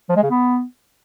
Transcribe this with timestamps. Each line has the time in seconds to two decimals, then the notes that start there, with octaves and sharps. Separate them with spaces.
0.09 F3
0.16 G#3
0.23 C#3
0.30 B3